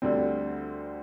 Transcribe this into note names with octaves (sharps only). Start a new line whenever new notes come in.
D2 D3 G3 C4